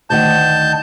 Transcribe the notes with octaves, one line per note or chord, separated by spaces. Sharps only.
D2 D#3 F#5 A5 G6